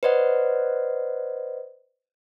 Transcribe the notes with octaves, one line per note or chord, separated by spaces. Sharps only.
B4 C5 D5 D#5 F#5